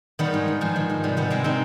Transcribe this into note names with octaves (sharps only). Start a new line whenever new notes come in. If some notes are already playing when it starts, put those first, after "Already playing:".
D#3 G3 B3
G#2
D#3
G#2 F3
D#3
G#2
C3 G3
D#3 G3 B3
C3 G#3 C4
D#3 C4 D#4